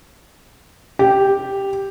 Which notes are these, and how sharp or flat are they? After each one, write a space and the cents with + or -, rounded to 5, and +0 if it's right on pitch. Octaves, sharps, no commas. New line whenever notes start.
G4 +0